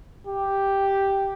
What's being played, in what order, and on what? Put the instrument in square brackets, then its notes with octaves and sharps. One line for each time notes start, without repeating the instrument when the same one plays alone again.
[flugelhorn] G4